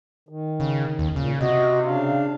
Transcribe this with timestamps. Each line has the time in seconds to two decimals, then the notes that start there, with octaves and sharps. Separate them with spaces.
0.29 D#3
0.60 C#3
0.99 D#2
1.16 A#2 C#3
1.41 C3 F#4 D#5
1.86 C#3 D4 F5